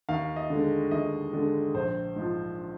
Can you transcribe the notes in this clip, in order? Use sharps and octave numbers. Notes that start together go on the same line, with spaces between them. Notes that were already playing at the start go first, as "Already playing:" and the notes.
D#2 F5
D#5
D3 G#3
D#2 D#5
D3 G#3
A#1 C5
G#2 F3